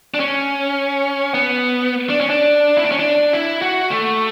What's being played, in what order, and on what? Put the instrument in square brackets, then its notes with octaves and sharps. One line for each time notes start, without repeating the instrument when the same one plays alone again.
[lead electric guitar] D4
C#4
B3
D4
C#4
D4
E4
D4
C#4
D4
E4
F#4
A3